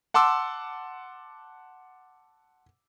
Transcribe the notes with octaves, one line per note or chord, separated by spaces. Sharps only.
F#5 A5 C6 D6 E6